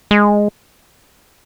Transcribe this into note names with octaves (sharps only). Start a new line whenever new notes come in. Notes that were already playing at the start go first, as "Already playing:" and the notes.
G#3